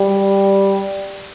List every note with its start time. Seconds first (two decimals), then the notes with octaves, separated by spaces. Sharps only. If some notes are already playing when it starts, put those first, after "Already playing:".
Already playing: G3